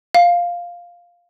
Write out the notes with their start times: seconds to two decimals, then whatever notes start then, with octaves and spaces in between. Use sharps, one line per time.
0.14 F5